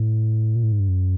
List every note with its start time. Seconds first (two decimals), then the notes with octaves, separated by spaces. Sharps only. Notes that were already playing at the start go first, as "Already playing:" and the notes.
Already playing: A2
0.55 A#2
0.63 A2
0.72 G#2
0.80 G2
0.88 F#2